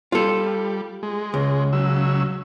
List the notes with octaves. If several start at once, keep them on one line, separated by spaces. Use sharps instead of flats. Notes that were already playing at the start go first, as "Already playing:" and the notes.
G3 F4 A4
G#3
C#2
C#3 F#3 E6